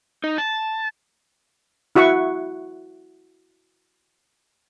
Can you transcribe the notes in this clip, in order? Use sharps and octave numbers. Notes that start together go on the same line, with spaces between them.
D#4
A5
E4 F#4 E5 F#5 C#6